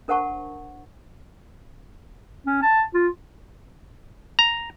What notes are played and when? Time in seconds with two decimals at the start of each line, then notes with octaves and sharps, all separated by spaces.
0.08 D4 A#4 C5 F#5 A5 C#6
2.47 C#4
2.62 A5
2.94 F4
4.39 A#5